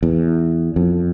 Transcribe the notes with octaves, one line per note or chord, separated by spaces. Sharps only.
E2
F2